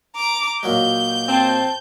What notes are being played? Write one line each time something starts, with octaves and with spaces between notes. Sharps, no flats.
A#5 D6
A#2 F#3 G#3 G6
C4 A5